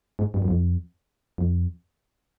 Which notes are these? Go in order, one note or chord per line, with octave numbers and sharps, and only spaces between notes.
G#2
G2
F#2
F2
F2